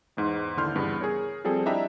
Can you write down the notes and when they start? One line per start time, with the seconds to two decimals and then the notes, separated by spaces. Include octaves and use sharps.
0.17 E2 G#2 C6
0.57 D#2 D3 E4 C6 F6 G6
0.75 G2 C#3 E3 B3
1.01 G#4 A#4 C#5
1.44 F3 G3 C4 G#4 A4
1.66 D4 E4 G4 D#5 E5 A#5